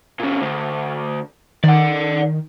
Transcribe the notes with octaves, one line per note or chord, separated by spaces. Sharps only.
A#2 C#3
D2
D#3 D5 F#5